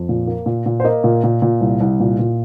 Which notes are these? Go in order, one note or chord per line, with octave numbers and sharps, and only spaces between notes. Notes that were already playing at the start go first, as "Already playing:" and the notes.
Already playing: F2
A#2
A#3
A#2
A#2
C5
A#3 D#5
A#2
A#2
A#2
C2
C2
A#2
A#2